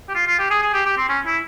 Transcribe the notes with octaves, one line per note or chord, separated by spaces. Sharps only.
G4
F4
F4
G4
G#4
G#4
G4
G4
C4
C#4
E4